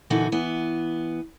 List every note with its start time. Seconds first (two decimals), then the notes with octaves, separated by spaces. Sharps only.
0.10 A#2 D3 E3 D#4 F#4
0.32 E3 B3